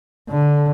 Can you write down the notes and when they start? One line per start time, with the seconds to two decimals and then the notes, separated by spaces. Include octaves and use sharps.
0.29 D3